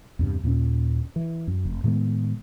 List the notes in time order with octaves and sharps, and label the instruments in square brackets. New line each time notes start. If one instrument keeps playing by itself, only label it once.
[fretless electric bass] E2 G2 C3
D#2 A#2 A#3 C#4
E3
F#2
F1
A2 D#3 G#3 B3